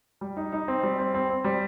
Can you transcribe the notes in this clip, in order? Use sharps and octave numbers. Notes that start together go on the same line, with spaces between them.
G3
D#4
D#4
C4
G3
C4
C4
C4
G3